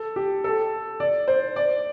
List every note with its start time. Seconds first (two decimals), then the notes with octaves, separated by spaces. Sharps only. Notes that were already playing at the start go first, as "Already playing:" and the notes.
Already playing: A4
0.16 G4
0.44 A4
1.00 D5
1.28 C5
1.56 D5